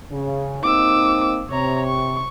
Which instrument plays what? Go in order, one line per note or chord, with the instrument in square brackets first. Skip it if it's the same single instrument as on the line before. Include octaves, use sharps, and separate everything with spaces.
[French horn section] C#3
[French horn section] A#3 C4 D#4 [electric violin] D6 E6
[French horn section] C3 [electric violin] C#5 A#5
[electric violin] C#6